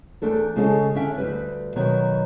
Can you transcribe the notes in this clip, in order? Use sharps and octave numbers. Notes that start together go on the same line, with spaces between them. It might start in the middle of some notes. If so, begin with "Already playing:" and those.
E2 A3 D4 A4 A#4
C#3 G#3 C#4 A4 G5 A5
D3 C#4 E5 G5
D2 G3 B4
B2 D#3 F#3 B3 A#4 C#5